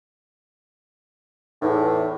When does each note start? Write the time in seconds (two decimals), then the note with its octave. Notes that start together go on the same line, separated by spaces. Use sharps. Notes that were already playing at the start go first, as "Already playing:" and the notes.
1.62 E2 A2 D#4